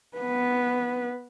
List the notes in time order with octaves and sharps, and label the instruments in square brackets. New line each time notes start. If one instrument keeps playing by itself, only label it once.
[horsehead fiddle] B3 B4